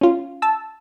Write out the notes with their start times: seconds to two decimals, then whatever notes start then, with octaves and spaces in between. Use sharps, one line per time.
0.01 C#4 F4
0.42 A5 E6